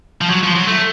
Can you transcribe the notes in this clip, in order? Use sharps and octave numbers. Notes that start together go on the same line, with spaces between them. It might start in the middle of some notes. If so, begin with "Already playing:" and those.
F3
F#3
F3
F#3
A3